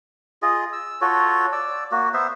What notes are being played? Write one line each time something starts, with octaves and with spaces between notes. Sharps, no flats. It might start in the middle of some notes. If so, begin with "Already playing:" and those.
F4 G#4 D#5
E6
F4 F#4 A4 C#5
D5 E6
A#3 F#4
B3 C5 E5